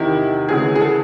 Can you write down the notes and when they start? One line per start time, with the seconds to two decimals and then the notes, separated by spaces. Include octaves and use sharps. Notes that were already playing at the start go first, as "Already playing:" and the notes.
Already playing: E2 C3 D#3 E4
0.49 D2 C#3 E3 G#4
0.75 G#4
0.81 A4